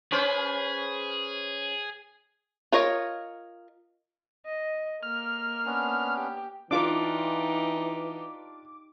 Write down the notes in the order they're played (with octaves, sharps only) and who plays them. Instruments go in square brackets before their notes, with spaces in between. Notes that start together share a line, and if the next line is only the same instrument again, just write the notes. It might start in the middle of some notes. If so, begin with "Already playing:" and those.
[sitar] C#4 B4 C5 [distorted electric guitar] G#4
[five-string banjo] F4 A#4 C#5 D#5
[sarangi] D#5
[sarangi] A#3 [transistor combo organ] F6
[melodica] B3 C#4 D4
[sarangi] G4
[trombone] E3 [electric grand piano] D4 F4 [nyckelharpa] D#4 G4 [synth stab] D6